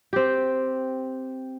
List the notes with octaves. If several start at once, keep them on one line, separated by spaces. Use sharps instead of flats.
C4 G4